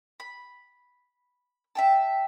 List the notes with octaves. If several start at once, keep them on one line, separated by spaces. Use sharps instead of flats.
B5
E5 G5 A5